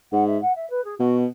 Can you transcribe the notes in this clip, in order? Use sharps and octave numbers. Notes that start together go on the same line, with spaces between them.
G#2 F#5
E5
F#5
E5
B4
G#4
B2 F#4